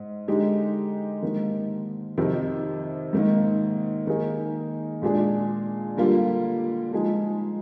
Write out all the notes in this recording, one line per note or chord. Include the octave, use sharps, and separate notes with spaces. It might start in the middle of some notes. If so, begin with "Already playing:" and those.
Already playing: G#2
D3 G#3 D#4 G4
G#2 D#3 A#3
F2 C3 D#3
G#2 D#3 A#3
D#3 A#3 D#4 G#4
A#2 G#3 D4 G#4
D3 G3 A#3 F4
F3 G#3 D#4 G#4